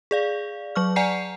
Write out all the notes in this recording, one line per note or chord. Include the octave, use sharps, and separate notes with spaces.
G#4 D5 F5
F#3 C#6 F6
D5 F#5 G#5 A#5 C7